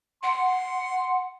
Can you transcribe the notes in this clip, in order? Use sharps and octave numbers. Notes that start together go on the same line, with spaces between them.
F#5 C6